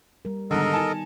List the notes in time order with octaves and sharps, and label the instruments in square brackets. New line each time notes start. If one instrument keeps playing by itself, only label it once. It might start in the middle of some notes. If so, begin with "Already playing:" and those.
[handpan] G3 A#4
[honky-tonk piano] G#2 D3 [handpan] D#3 G3 B3 [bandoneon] A4 A#4 D#5
[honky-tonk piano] D#4 G#5 A5